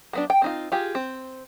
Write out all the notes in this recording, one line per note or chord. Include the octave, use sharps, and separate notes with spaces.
F#3 B3 D4
G5
C4 D#4 F4
F4 G4 G#4
C4